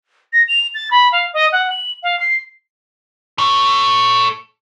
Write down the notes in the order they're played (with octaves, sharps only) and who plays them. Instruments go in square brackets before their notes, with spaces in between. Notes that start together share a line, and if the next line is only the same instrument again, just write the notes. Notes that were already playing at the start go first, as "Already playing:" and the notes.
[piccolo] A#6
F7
A6
B5
F5
D#5
F#5
F#7
F5
C7
[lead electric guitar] A4 C#5